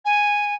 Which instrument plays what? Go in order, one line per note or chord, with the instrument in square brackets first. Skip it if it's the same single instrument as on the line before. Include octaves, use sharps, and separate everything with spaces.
[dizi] G#5